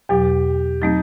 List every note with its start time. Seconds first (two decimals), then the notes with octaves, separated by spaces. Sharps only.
0.09 E2 B2 F#3 G4
0.82 F#3 A3 C4 D#4